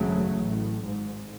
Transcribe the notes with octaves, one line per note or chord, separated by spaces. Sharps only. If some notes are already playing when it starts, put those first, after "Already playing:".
Already playing: G#1 F#2 C#3 F#3 A3
A1 A2
G#1 G#2